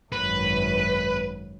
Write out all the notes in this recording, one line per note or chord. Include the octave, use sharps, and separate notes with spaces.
G#1 F#2 B4